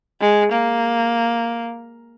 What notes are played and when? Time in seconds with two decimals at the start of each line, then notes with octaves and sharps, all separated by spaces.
0.21 G#3
0.52 A#3